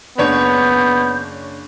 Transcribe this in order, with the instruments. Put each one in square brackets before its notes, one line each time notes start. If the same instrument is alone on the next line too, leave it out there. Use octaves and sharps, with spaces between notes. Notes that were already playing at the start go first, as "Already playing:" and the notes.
[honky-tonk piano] F#1 D4 C#5 [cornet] B3 [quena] G6